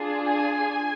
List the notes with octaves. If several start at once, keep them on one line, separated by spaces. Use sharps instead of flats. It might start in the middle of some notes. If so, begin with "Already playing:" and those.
Already playing: D4 F4 G#4
G#5